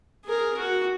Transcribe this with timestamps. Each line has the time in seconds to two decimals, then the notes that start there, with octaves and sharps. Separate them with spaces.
0.25 G#4 A#4
0.58 F#4